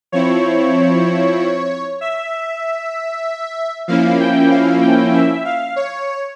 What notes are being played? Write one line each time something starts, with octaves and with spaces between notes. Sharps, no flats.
F3 C4 E4 C#5
E5
F3 A#3 C#4 E4 F5
G5
F5
G5
E5
F5
C#5